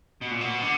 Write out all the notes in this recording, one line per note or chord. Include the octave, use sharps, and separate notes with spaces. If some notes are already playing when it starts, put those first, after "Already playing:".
B2
A#2
B2
D3